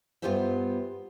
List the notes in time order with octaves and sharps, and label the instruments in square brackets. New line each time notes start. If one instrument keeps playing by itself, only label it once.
[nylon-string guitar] G2 B3 F4 G4 C5 E5